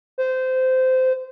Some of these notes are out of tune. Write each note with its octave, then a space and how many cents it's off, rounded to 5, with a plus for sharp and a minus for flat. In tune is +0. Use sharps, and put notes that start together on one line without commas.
C5 -20